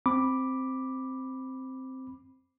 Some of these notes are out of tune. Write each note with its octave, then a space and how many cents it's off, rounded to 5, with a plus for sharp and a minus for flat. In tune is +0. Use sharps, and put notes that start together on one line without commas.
C4 +0 B5 -5 D6 +0